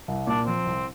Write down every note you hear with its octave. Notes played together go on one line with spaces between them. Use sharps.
C2
A#2 D4
F3 C4
C2